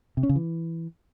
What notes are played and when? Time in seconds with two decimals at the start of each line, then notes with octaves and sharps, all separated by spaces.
0.17 C3
0.23 C#4
0.29 C#3
0.36 E3